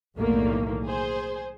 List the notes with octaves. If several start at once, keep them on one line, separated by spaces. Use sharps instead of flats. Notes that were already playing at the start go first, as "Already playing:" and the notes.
B1 E2 A2 D#3 A3 A#3
G#4 C5